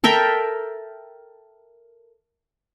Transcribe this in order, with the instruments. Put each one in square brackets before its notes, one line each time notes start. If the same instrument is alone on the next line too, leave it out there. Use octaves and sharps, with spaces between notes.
[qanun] A4 A#4 E5 G5